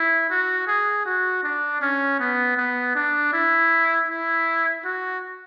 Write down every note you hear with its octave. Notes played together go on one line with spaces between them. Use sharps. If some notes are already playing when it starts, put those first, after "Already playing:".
Already playing: E4
F#4
G#4
F#4
D4
C#4
B3
B3
D4
E4
E4
F#4